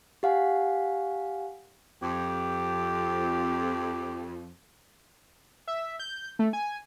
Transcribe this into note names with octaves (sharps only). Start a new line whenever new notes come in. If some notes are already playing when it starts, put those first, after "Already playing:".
G4 F5 F#5 G#5
F2 G4
E5
G6
A3
G#5